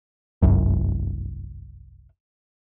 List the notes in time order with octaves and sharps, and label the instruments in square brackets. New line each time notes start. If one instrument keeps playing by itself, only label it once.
[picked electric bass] G1 C2 F#2